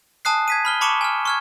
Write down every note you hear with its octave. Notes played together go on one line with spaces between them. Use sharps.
G#5 A5 D#6 F#6 C7
G#6 B6 D#7
B5 F6 G7
A5 B5 C#6 D6 C#7 E7
G#5 F6
C#6 F6 G#6